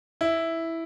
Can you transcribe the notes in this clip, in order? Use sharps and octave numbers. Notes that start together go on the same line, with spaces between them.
E4